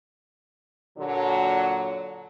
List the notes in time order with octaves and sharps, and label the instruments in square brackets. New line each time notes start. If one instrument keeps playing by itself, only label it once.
[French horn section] A#2 D3 F#3